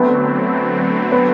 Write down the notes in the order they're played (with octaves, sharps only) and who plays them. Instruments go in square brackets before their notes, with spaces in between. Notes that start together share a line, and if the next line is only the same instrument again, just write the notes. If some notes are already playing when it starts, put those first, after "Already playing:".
Already playing: [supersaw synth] D3 F#3 A3 C4 [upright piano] B3
[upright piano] B3